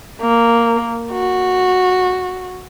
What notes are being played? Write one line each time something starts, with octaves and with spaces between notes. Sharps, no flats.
A#3
F#4